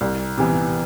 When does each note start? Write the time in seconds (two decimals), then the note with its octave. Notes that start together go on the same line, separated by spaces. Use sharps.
0.01 C2
0.38 C3 E3 B3